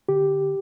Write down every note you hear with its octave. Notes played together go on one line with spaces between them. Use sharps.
D3 G4